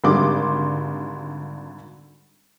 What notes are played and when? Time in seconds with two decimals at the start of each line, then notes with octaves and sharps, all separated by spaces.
0.04 G#1 D3 G3 C6 D6